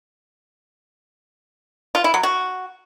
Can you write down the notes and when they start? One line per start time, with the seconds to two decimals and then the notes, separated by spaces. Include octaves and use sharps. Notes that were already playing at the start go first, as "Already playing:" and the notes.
1.95 F4
2.04 E4
2.14 F#3
2.23 F#4